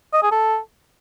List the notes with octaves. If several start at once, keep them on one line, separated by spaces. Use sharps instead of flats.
D#5
G#4
A4